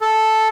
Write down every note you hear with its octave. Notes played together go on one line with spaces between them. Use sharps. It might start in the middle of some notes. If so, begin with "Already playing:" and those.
A4